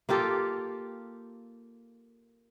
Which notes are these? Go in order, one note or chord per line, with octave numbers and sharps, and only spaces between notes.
A#3 F4 G4 A4